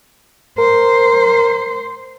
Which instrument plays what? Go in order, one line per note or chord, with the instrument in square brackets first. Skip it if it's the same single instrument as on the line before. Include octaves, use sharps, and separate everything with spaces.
[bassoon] A#4 [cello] C5